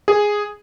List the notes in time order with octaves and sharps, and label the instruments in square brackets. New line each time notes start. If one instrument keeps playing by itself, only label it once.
[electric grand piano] G#4